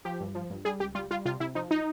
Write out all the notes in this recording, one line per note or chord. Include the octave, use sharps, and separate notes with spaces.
F3 G4
G2
F3
G2
G3 G#4
C#2 G4
G3 F4
G3 F4
C3 F4
C3 E4
F3 D#4
D#4